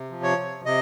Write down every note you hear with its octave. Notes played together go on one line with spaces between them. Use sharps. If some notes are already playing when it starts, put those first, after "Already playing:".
Already playing: C3
F3
C#5
C3
C3 D#5